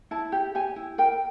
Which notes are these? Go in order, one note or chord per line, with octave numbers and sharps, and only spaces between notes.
E4 A5
G4
G4 G#5
E4
A#4 G5